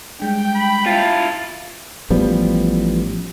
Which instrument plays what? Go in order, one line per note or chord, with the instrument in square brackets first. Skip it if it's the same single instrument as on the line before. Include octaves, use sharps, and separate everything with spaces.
[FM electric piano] G3 G#3 D4 [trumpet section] G5
[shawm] B5
[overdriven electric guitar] E4 F4 [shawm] A5
[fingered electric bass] A1 F3 G3 B3